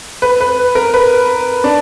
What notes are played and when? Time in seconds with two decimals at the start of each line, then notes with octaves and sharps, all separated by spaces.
0.22 B4
0.41 B4
0.75 A#4
0.94 B4
1.64 D4